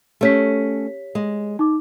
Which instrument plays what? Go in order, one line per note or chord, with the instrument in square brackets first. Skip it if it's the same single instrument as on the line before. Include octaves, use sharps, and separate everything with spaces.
[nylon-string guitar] A3 C#4 [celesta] G4 C#5 B6
[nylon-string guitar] G#3
[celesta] D#4 D6